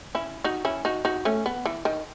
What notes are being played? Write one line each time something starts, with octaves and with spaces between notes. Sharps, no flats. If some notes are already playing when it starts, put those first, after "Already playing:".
C#4 E4
D#4 F#4
C#4 E4
D#4 F#4
D#4 F#4
A3 C#4
B3
E3
D#3